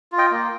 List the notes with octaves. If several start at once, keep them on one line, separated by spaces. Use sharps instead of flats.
F4
D#5 G5
A#3